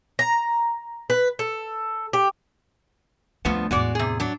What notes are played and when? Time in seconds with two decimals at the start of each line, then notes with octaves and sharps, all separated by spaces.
0.19 A#5
1.10 B4
1.39 A4
2.13 G4
3.45 D2 G2 F3 A3 B3
3.71 E2 A2 G#3 F#4 D5
3.95 C3 G#4
4.20 F#3 D4